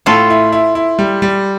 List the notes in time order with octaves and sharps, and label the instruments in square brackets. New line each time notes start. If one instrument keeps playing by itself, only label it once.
[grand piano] A2 [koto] F4 A4
[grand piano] E4
E4
E4
G3
G3